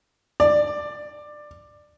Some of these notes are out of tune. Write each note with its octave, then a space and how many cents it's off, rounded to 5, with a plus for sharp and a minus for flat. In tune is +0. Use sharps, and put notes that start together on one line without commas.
D5 +15